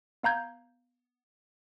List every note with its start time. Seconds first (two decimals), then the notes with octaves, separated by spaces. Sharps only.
0.23 B3 F5 A#5 G6 G#6